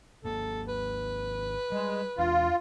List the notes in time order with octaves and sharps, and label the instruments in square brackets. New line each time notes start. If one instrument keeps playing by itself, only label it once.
[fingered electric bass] G#1 A#3 [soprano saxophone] A4
[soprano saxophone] B4
[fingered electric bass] G3 [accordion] G#3
[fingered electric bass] E2 E3 D4 [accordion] F4